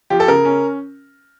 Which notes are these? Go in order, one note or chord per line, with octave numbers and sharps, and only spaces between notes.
F3 G4
A4
C#3 A#4
C#4